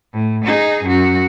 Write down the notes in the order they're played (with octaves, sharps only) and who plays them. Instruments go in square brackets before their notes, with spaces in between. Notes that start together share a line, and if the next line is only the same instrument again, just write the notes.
[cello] A2
D#4 G#4
F#2 F#4